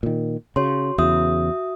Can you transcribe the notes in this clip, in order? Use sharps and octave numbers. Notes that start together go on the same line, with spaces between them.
A#2 D#3
C#3 F#4 C#5 C6
E2 C#3 F#4 E5 D#6